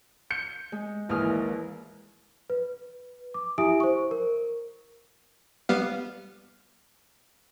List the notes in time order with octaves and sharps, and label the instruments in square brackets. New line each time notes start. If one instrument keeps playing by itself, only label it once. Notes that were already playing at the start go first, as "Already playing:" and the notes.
[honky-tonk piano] G6 C#7
[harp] G#3
[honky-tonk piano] A#1 G#4 [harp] D#2 D#6 F6 [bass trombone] E3
[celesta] B4
D6
E4 G4 E5 G#5 D#6 D7
C5 C#6
A#4
[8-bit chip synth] G3 B3 F5